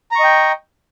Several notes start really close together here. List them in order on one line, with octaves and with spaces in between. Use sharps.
A#5 C#6 D#5 G5